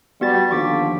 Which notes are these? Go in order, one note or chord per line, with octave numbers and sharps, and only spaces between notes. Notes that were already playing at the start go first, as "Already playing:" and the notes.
G3 B3 F#4 A6
D#2 D3 F3 C#6 D6 B6